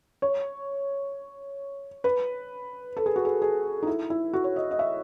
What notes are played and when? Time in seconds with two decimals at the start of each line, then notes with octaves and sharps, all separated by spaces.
0.22 C#5
2.04 B4
2.97 A4
3.06 G#4
3.16 F#4
3.25 G#4
3.42 G#4
3.82 D#4
3.87 E4
4.10 E4
4.33 F#4
4.44 C#5
4.56 D#5
4.71 D#5
4.79 E5